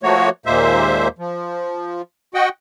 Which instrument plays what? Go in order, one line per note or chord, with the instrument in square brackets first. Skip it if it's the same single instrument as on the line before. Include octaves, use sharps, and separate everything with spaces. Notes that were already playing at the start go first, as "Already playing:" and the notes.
[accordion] F3 A3 A#3 F#4 C#5
D#2 A#2 G#3 A#3 C5 E5
F3
F#4 D#5 F#5 G5